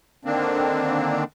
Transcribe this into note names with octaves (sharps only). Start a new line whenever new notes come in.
D3 D#3 A#3 C4 D4